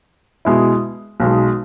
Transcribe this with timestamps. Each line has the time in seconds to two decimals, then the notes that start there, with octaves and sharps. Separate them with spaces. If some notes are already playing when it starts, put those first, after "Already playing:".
0.45 B2 G#3 E4
1.20 B1 B2 G#3